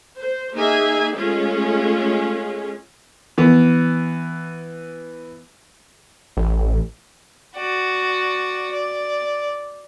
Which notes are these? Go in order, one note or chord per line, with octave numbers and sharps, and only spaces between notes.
C5
A#3 D#4 G#4 E5 G#5
G#3 A3 C#4 F4 G#4
E3 B3
A1
F#4 D5
D5